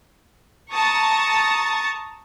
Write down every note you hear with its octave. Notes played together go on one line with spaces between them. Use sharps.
A5 A#5 C#6 D#6 A6